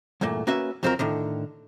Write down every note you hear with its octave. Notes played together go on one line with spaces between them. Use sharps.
E2 G2 A#2 A3 A#3
A#3 C#4 F#4 B4 E5
F2 F#3 C4 F4 A4 A#4
A2 D3 D#3